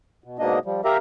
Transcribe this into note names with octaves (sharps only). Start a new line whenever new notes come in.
B2
G#2 B2 A#3 D4 D#5
F3 G3
G4 A#4 E5 F5 A#5